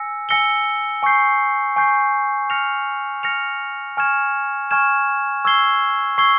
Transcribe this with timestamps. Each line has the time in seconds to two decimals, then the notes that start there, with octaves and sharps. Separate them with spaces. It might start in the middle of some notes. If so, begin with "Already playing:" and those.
Already playing: G#5 E6 A#6 C#7
0.29 G#5 E6 A#6 C#7 G7
1.03 G#5 C#6 G6 C7
1.76 G#5 C#6 G6 C7
2.50 F6 A#6 C#7 F7
3.23 F6 A#6 C#7 F7
3.97 G#5 C#6 F6 G#6 E7
4.71 G#5 C#6 F6 G#6 E7
5.45 C#6 E6 G#6 C7 G7
6.18 C#6 E6 G#6 C7 G7